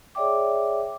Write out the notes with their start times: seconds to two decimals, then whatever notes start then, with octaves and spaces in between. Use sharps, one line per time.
0.15 G#4 C#5 D5 E5 G5 D6